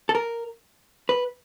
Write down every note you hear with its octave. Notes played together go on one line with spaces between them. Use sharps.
A4
A#4
B4